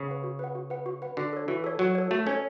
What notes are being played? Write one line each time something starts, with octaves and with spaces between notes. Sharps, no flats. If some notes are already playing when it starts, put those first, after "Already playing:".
Already playing: C#3
B4 F#5
F#4
B4 F#5
F#4
B4 F#5
F#4
B4 F#5
D3 F#4
A4 C#5
E3 F#4
A4 C#5
F#3 F#4
A4 C#5
A3 F#4
C#4 A4 C#5